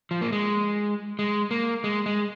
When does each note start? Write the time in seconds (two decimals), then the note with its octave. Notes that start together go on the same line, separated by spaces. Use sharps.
0.11 F3
0.21 A#3
0.32 G#3
1.19 G#3
1.51 A#3
1.84 G#3
2.06 G#3